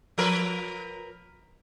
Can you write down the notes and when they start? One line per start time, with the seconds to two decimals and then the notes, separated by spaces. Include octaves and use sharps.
0.18 F3 A#4 B4